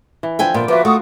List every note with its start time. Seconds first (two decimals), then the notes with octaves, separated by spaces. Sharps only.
0.23 E3
0.39 D3 F3 E5 G5 G#5
0.54 A#2 B3 F4 G5
0.68 F3 A#3 F4 F#4 B4 E5 D6
0.85 A3 F#5 C#6 D#6